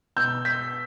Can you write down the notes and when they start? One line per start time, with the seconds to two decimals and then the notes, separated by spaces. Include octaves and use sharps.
0.17 B2 E6 G6
0.45 G6 B6